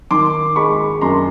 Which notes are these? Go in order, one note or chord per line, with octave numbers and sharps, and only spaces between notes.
D#3 C6 D6
G#3 B5 C#6
F#2 A#5 C6